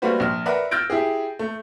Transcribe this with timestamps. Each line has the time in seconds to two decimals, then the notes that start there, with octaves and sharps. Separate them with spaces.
0.02 G3 A3 A#3 F#4 B4 C5
0.20 A#1 F6
0.46 A#4 B4 D5 E5 F#5 A#5
0.71 E6 F6 G6 A6 A#6 D7
0.90 E4 G4 G#4
1.39 A3